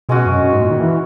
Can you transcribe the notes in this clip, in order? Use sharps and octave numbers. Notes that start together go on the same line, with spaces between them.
B2 G#3 C#4 F#4
F#2
F#2
G#2
A#2
D#3
E3